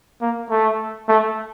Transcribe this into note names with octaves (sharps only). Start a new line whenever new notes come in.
A#3
A3
A3